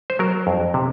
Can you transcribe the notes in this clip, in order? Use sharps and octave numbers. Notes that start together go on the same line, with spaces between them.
C5
F#3 A#4
F2
C3